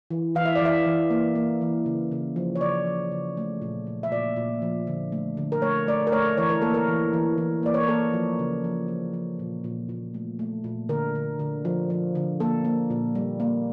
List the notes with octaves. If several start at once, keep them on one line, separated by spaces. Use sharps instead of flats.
E3
E3 F5
E5
D5
E3 E5
E3
A#3
A#3
E3
C#3
C#3
F3
C#5
C#3 D5
F3
C#3
A3
A#2
A#2
E5
A#2 D5
A#2
F3
D3
A3
D3
A#4
A3 C#5
A3 D5
A#4
A3 C#5
E3 C#5
A#4
A#3 A4
A#4
E3
E3
E3
A#3 D5
C#5
A#4
A#3 A4
F3
C#3
F3
F3
F3
A#2
A#2
A#2
A3
A3
A#2
D3 A#4
D3
D3
F3
F3
D3
A#3 A4
A#3
A#2
G3
A#3